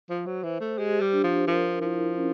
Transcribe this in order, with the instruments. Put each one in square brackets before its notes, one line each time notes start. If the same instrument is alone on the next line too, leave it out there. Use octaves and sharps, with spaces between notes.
[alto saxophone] F3 [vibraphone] C5
[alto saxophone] F#3
[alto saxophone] E3 [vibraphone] C5
[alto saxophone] A3
[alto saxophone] G#3 [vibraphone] G4
[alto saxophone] G3
[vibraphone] D4
[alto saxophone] F3
[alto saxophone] F3 [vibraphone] A#4
[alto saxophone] F3 [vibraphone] E4
[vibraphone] C#4